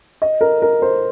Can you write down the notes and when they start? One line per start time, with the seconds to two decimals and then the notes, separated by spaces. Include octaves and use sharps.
0.22 D#5
0.41 A#4
0.62 A#4
0.82 C5